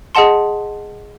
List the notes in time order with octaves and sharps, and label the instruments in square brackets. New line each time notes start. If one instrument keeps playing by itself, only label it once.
[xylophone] G#4 D#5 F#5 A5 C6